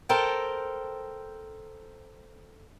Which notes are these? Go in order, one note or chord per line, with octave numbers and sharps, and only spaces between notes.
A4 A#4 C5 G5 A5